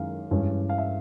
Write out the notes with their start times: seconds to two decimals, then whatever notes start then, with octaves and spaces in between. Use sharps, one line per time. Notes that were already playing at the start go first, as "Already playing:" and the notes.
Already playing: F#2 D#3 G#3 F5
0.31 G2 E3 G#3 C#4
0.69 F5
0.78 E5